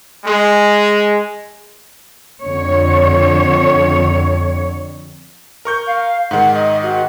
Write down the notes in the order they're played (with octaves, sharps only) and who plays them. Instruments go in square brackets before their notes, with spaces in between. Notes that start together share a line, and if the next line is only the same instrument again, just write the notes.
[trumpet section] G#3
[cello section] F2 D3 C#5
[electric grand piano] A#4 C#6 G6
[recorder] F5
[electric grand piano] G#2 D#3 [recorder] F#5
[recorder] D#5
F#4